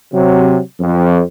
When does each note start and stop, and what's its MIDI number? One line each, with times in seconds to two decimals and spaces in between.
0.13 0.59 48
0.13 0.59 54
0.80 1.21 41